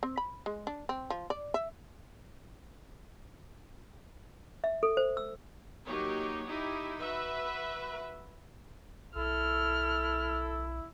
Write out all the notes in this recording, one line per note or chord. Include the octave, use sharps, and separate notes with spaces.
C4
B5
G#3
D4
C4
F3
D5
E5
E5
A4
C5
E6
F#3 A#3 D#4 G4 C#5
D#4 E4 G4
F#4 B4 E5
B1 E4 A4 F6